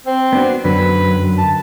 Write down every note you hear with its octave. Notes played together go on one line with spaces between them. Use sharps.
C4
B3 D4 F#4
F#2 D3 F#3 B4
A5